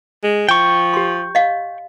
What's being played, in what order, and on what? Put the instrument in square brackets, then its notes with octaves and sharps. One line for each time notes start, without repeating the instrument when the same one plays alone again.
[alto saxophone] G#3
[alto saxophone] F3 [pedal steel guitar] G5 C#6
[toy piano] G4 C6
D#5 F5